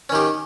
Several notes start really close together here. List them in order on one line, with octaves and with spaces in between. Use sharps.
C#4 D#3 G4